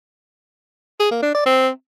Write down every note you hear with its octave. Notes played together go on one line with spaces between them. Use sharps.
G#4
A#3
D4
D5
C4